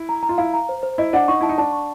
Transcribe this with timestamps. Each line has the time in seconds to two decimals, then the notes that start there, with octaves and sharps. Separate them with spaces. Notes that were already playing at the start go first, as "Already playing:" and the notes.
Already playing: E4
0.09 A#5
0.23 A#5
0.29 F4
0.38 E4 F5
0.54 A#5
0.69 C5
0.83 C5
0.98 E4 D#5
1.13 D4 F#5
1.28 D#4 C#6
1.41 E4 A5
1.49 D#4
1.58 D4 A5
1.73 C#6